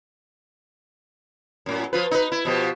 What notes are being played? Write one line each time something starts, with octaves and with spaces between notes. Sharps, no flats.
F#2 A2
F3 F4 B4
D#4 B4
E4
B2 F3 G4